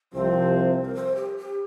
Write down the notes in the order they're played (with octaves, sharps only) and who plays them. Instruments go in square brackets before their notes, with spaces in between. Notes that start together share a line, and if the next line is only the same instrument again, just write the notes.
[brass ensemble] C2 C3 F3 C4 [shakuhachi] C5
[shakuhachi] A#4
C5
G4
G4